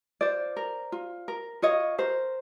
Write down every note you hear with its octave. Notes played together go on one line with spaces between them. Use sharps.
F4 C5 D5
A#4
F4
A#4
F4 C#5 D#5
A#4 C5